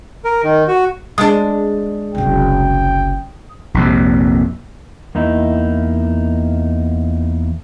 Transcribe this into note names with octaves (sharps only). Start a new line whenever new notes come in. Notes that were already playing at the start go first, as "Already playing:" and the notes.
A#4
D#3
F#4
G#3 D4 D#6
F#1 C2 G5
A#1 F2 C3
E2 A#3 D#4 E4